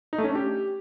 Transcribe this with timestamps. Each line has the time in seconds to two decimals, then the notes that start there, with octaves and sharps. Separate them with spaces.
0.13 D#4
0.18 A3
0.24 C#4
0.30 D4
0.35 G4